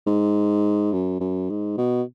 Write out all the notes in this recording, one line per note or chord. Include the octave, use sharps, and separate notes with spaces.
G#2
F#2
F#2
G#2
B2